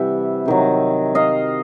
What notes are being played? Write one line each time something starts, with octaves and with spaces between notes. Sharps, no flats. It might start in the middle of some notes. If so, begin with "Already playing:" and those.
Already playing: C3 E3 G3 E5 F#5
C3 D#3 F#3
D#5 F5